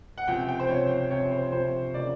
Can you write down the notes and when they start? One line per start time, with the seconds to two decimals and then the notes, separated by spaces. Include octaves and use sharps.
0.18 F#5
0.28 C#2 C3 F3 G5
0.48 G5
0.60 C5
0.69 C#2 C3 F3 C#5
1.11 C#2 C3 F3 C#5
1.31 C5
1.52 C#2 C3 F3 C5
1.94 C#3 F3 A#3 D5